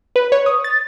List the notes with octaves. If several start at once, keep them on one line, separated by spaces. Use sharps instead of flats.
B4
C#5
D#6
A6